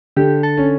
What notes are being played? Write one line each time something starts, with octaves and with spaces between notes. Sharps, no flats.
D3 G4
A4
C#4